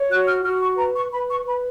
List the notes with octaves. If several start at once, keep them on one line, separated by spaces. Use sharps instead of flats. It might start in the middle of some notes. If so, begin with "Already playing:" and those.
Already playing: C#5
F#4 F#6
F6
F#4 F6
C#6
B4 A#5
C#6
B4 B5
C#6
B4 B5